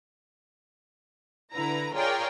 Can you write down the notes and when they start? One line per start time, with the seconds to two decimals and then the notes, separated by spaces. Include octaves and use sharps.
1.53 D3 E4 B4 A#5
1.93 F4 G#4 A#4 C#5 D5 G5